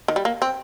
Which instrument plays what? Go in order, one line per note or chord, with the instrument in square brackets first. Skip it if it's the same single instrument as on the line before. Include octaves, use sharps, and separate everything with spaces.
[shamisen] D#3
G3
A#3
C4